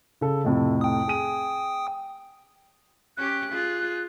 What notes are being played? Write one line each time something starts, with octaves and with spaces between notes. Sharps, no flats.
C#3 A4
F2 A2 C3
G5 D#6
G#4 D#7
C#4 G4 F#6
F4 G#4